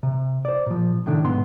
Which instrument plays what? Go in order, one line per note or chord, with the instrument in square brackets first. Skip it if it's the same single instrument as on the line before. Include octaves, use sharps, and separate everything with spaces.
[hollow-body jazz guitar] C3
C5 D5
A#2 F3
A2 C3 D#3 A3 D4
B1 G#2 B3 C6